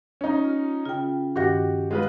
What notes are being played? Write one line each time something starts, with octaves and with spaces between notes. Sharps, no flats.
C#4 D#4
F4
C#3 F4 G5
G2 D#3 F#4 G4 F#5 A#6
G#3 F4 B4